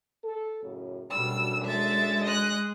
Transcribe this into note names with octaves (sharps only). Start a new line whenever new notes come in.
A4
F#2 A2 C#3
F#2 B2 G3 A3 D4 E6
G#3 E5 A6
D#5 F#6